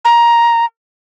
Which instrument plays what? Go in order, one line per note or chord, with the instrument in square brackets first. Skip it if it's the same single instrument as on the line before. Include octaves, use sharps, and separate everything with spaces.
[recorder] A#5